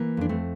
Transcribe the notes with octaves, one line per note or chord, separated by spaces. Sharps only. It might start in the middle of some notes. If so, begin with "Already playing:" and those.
Already playing: E3 A#3
F2 D4
A3 C4